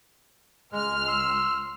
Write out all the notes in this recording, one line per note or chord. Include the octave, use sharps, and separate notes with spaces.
C#2 G#3 F6
C6 E6